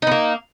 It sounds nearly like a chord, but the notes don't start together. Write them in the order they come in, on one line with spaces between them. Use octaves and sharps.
D#4 B3 A#3